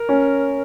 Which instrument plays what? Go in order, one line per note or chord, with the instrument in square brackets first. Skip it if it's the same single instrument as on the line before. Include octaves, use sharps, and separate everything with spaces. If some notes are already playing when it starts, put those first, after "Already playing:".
Already playing: [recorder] A#4
[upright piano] C#4